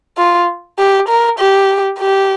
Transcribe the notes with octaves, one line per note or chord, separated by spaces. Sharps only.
F4
G4
A#4
G4
G4